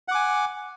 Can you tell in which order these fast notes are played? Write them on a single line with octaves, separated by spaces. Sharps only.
F#5 D6 G#5